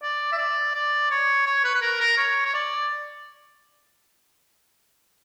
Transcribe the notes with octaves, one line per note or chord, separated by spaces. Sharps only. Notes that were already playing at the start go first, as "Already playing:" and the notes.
D5
E5
D5
D5
C#5
C#5
B4
B4
A#4
A#4
C#5
C#5
D5